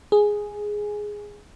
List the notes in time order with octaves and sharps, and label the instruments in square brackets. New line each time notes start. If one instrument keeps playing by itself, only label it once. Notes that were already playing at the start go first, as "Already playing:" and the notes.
[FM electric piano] G#4